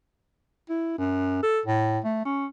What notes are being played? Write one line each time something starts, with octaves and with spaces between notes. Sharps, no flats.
E4
F#2
A4
A2
A3
C#4